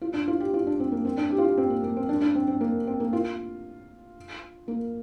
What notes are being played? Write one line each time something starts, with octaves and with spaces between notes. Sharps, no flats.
F4
D4
F4
G4
F4
D4
C4
A#3
C4
D4
G4
F4
G4
C4
A#3
A#3
C4
D4
D4
C4
C4
A#3
C4
A#3
F4
A#3